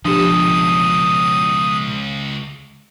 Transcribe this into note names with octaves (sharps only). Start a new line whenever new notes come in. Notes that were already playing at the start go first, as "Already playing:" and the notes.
C#2 B2 F3 D4 G4 A4 D#6